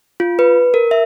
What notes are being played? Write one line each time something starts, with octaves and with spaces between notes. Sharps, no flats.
F4
B4
A#4
E5